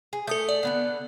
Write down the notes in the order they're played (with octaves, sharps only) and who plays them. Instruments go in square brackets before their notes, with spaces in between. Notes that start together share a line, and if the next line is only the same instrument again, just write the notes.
[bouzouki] G#4
[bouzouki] A3 E5 [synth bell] A4 D#6 G6
[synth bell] D5
[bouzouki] D3 B3 F#5